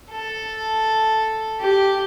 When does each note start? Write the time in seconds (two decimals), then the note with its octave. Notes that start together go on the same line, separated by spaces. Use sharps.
0.11 A4
1.60 G4